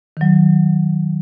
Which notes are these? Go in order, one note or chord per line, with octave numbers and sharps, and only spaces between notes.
D#3 F#3